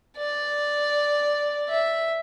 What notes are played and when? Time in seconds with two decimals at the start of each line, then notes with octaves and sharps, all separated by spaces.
0.17 D5
1.69 E5